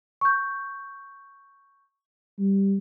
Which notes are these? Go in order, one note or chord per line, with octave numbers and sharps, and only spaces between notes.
C#6 G6
G3